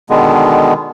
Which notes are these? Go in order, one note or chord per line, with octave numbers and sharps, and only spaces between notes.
B2 D3 D#3 G#3 B3